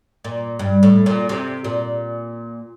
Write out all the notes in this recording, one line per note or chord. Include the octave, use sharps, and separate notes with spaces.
A#2
G2
A2
A#2
C3
A#2